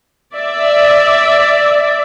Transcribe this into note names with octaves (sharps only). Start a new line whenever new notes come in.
D5 E5